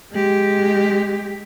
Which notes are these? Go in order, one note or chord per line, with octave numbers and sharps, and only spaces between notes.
G#3 G4